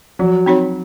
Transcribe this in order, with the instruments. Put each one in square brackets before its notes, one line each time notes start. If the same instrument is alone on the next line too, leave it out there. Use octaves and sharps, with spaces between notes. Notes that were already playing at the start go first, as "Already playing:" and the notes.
[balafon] F3 [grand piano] F#3
[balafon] C4 D#4 F#4 C#5